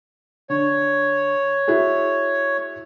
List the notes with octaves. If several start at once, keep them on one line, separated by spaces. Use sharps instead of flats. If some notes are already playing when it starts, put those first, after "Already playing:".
D3 C#5
E4 F#4 G#4